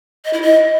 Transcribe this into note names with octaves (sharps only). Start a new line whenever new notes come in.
D#5
E4
D#5